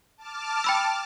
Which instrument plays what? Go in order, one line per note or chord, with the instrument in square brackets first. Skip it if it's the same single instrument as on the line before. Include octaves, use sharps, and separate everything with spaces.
[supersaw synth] A5 D6 F6
[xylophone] G5 B5 E6